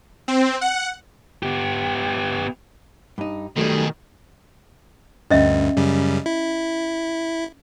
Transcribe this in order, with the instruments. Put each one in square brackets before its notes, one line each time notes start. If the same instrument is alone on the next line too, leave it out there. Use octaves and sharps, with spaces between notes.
[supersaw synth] C4
F#5
[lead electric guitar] B3 G4
[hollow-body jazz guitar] G2 D#4
[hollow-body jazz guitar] F#2 G3 [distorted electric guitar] B2 G#4 [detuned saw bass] D#3 [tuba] A3
[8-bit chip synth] D2 G2 [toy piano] C#4 D#5 E5
[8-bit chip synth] F#2 C#3 G3
E4